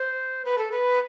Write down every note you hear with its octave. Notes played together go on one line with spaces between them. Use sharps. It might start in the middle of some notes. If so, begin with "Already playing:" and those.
Already playing: C5
B4
A4
B4